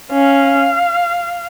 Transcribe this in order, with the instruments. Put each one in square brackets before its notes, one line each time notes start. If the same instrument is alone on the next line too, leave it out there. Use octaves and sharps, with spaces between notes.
[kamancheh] C#4 [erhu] F5